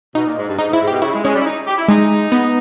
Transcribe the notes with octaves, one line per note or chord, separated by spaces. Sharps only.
B2 D#4
A#2
G#2
G2
G#2 D#4
G#2
E4
G#2
B2 G4
C#3 E4
G#3
G#3 C#4
G3
E4
D#4
G4
E4
G#3 D#4
B3